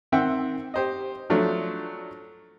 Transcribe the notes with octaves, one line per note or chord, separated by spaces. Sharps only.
D#3 C4 E5 F#5 G5
G4 C5 D#5
F3 F#3 A3 D4